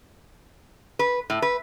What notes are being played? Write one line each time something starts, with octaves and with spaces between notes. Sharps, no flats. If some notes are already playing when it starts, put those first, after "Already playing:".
B4
A2
B4